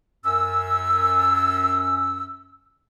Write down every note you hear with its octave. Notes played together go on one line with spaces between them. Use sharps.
F#2 C#4 E6